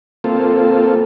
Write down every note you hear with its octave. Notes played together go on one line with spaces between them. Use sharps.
A#3 C4 F4 A4